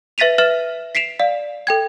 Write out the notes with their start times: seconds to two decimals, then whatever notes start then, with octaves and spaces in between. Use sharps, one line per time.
0.18 B4 E5 A6 B6 D#7 F7
0.38 B4 E5 F6 A6 E7
0.95 B6 C7 D7 E7 F7
1.19 D5 F5
1.67 A4 G5 G#6